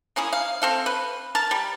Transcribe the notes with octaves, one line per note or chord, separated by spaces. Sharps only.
A#3 C#4 E4 G#4
F5
C4 A4 F5
B4
A#4 A5
G3